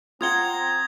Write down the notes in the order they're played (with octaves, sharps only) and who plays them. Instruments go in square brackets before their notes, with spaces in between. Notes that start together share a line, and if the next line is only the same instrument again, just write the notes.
[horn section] C4 A#5 [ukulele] F4 F#5 [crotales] D#6 G#6 G7